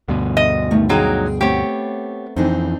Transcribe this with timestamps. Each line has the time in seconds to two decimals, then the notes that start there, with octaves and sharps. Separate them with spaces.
0.08 D2 G2 B2
0.37 D#5
0.71 D#3 A3
0.89 D3 F#3 D#4 G#4 F5 G5
1.41 A3 B3 C4 G4 C#5
2.36 F2 E3 C4 D4 D#4